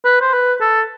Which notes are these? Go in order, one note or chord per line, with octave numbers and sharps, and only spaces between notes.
B4
C5
B4
A4